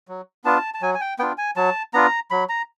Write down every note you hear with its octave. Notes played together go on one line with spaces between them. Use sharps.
F#3
B3 D4 F4 A5
A5
F#3 G#5
G#5
G5
B3 D4 F4 G5
G#5
F#3 A5
B3 D4 F4 A#5
F#3 B5
A#5